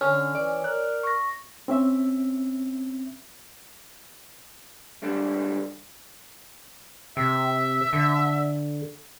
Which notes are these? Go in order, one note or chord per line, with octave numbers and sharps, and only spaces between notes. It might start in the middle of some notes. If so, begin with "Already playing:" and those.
D3 C#4 F6
E3 D5
A#4 F#6
C#6 A#6
C4 C#4 E5
C#2 G3 D4 A4
C3 E5
D3